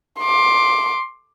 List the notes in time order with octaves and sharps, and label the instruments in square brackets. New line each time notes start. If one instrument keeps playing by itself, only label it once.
[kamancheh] C6 D6